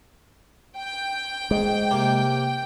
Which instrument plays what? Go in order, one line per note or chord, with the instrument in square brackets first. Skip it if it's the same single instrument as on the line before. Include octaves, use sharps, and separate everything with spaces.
[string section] G5
[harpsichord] G#2 [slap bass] G#3
[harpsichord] C3 A#3